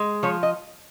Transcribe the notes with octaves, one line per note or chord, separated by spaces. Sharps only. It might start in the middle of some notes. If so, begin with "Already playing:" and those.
Already playing: G#3
F3 C#5
D#5